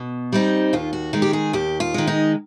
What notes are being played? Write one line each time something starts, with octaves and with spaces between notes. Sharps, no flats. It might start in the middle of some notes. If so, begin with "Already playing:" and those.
Already playing: B2
G3 C4 D#4
D#2 F4
F#4
D#3 G#3
G4
G#4
D#2 G4
F4
D#3 G#3
D#4